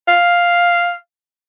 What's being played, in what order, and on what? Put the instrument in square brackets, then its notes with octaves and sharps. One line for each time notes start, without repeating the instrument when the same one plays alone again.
[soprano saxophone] F5